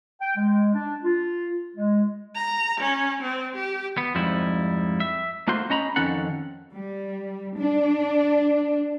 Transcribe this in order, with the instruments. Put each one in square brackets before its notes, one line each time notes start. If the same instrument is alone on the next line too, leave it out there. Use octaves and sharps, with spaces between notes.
[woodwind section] G5
G#3
D4
F4
G#3
[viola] A#5
C#4
C4
G4
[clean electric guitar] B3
F2 G#2 F3 G3 E4
E5
A3 A#3 F4 F#4 C5 C6
C#4 D#5 A#5 B5
F2 D#3 C#4 A4 F#5
[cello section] G3
D4